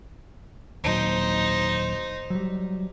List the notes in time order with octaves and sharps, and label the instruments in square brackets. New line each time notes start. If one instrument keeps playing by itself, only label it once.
[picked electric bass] D#2 A#2 F#3 [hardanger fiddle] D#4 C5
[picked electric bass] F#3 G3